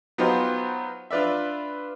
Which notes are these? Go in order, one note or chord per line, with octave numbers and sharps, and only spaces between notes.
F#3 B3 D#4 F4 G4 C5
D4 F4 B4 D5 E5